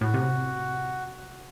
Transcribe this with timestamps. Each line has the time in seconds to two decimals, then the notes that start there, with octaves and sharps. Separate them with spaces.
0.01 A2 F#4
0.14 C3